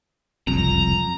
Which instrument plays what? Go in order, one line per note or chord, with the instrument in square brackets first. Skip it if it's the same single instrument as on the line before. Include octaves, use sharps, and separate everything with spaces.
[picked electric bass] F#1 C2 F2 [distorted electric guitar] A#5